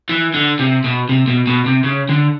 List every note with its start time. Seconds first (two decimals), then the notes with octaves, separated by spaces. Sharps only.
0.10 E3
0.34 D3
0.59 C3
0.84 B2
1.09 C3
1.28 B2
1.47 B2
1.66 C3
1.84 C#3
2.10 D3